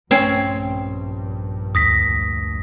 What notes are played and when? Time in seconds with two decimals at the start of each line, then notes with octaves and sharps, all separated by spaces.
0.11 A#1 G2 C4 C#4
1.75 D2 D#6 A#6 B6